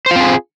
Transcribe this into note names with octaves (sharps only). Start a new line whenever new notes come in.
C4 F4 G#4 C5